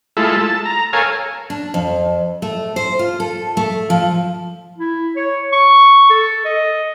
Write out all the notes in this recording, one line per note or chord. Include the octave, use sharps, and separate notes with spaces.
G#3 A3 E4 F4 A4
A5
A#5
A4 A#4 C#5 F5 G#5
D4
F2
A3
C5
F4
A4
A3
F3
E4
C#5
C#6
A4
D#5